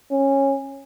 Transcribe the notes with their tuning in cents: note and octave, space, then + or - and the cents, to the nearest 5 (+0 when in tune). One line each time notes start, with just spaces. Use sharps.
C#4 -15